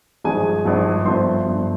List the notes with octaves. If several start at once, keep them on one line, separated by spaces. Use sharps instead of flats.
G#1 G2 F3 G#4 G#5
G#1 G2 F3
G1 G2 F3 C5 C6
G1 G2 F3